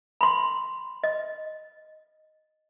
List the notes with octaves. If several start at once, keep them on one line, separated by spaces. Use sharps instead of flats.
B5 C6
D#5